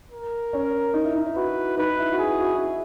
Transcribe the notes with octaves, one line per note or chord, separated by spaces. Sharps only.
A#4
C#4
D#4
E4
D#4
E4
F#4 B4
D#4 B4
E4
F#4
G#4
E4
F#4
E4